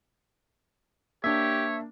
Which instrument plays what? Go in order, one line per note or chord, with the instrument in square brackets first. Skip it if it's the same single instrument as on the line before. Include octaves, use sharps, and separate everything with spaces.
[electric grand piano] A#3 D4 [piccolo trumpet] G4 [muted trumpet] C#5 [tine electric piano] E5